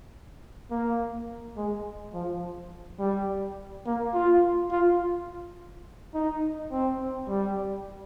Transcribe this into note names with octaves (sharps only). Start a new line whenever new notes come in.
A#3
G#3
F3
G3
A#3
F4
F4
D#4
C4
G3